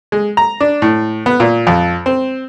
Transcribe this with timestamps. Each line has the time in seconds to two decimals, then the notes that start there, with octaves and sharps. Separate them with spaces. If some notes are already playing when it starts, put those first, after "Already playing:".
0.12 G#3
0.37 A#5
0.60 D4
0.82 A2
1.26 B3
1.40 A#2
1.67 F2
2.06 C4